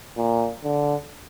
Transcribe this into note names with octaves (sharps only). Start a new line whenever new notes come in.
A#2
D3